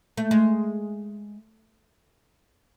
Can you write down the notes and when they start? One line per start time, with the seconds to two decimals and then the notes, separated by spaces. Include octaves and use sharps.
0.17 A3
0.31 G#3